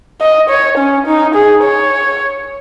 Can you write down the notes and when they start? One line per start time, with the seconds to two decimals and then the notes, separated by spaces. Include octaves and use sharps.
0.21 D#5
0.50 C#5
0.78 C#4
1.07 D#4
1.35 G#4
1.63 C#5